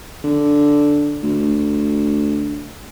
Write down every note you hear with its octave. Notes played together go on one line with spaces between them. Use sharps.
D3
D2